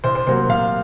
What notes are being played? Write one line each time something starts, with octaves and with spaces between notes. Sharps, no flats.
C2 C5
C5
C3 F#3 A#3 C5
C2 F5